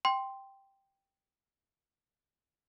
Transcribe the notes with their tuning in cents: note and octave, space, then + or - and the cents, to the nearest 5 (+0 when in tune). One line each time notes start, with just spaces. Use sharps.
G5 +0 C6 +0